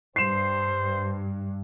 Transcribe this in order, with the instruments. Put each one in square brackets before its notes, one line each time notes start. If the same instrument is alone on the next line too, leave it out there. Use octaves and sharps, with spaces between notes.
[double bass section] G2 [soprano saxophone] C5 [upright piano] C7 E7